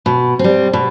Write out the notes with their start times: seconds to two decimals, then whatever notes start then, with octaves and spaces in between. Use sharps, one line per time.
0.06 B2
0.39 G3 C4
0.73 B2